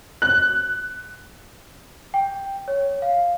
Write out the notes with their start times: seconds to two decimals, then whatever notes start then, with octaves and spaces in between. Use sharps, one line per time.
0.22 F#6
2.14 G5
2.68 C#5
3.02 F5